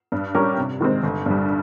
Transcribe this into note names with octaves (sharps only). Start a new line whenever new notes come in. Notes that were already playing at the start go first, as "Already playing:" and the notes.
G2
G3 C#4 G4 A#4
C3
D#3 G#3 C4
G1
G2 G3